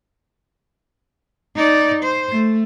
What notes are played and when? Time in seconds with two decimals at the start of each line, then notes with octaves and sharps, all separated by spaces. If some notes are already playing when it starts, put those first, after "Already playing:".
1.55 D#4 D5
2.03 C5
2.32 A3